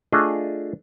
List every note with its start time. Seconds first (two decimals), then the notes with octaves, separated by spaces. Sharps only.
0.12 A3 D4 F4 G#4 D#5